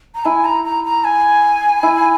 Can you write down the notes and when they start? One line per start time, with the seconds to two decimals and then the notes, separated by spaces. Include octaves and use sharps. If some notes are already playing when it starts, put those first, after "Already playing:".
0.15 A#5
0.25 E4 G#5
0.45 A#5
0.64 A#5
0.84 A#5
1.04 G#5
1.83 E4